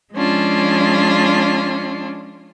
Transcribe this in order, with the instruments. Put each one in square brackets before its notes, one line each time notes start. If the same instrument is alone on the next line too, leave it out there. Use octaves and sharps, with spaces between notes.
[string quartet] F3 G#3 C#4 D4 F4